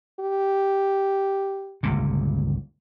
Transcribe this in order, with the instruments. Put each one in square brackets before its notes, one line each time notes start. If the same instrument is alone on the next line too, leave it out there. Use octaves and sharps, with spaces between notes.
[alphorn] G4
[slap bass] G1 C#2 A#2